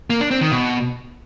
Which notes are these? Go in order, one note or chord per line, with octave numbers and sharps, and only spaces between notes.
A#3
D4
C4
D#3
B2